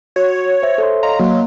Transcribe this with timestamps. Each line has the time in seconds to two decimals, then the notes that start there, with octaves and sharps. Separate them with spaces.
0.16 F#4 C#5
0.63 C5 E5
0.78 A4 C#5 C6
1.03 D#5 F5 A#5 C6
1.19 F#3 A#3